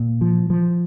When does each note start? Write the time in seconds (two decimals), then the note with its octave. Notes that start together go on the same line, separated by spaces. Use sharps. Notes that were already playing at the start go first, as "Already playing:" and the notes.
Already playing: A#2
0.21 F3
0.50 F3